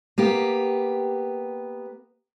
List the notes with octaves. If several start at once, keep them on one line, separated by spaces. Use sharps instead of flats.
A#3 B3 G4